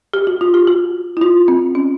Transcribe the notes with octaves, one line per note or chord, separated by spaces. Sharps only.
G4
F#4
F4
G4
F#4
E4
F4
C4
C#4